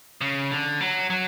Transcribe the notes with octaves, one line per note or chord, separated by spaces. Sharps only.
C#3
D3
F#3
F#3